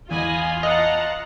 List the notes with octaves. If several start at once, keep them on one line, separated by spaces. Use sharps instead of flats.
E2 F4 D#5 G#5 B5
D#5 F#5 A5 A#5